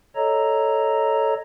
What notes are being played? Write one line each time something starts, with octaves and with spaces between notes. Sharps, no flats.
A4 C#5 D#5 A#5